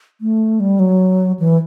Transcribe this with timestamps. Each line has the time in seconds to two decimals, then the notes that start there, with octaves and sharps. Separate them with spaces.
0.21 A3
0.60 G3
0.79 F#3
1.39 E3